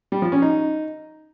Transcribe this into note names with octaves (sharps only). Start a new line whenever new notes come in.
G3
F3
C#4
D#4